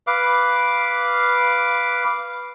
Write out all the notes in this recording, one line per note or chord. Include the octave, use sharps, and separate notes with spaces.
B4 F5 D6